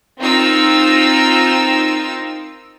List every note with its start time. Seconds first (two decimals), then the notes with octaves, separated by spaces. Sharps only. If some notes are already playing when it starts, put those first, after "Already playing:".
0.18 C4 D#4 F4 A#4 E6